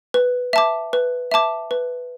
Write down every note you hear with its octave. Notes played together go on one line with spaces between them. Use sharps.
B4
E5 A5 D6
B4
E5 A5 D6
B4